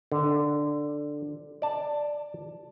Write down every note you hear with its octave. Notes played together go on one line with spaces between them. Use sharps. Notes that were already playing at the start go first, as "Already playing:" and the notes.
D3
D5 A5